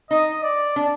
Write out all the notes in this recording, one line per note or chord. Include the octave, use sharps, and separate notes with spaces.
D#4 D#5
D5
D4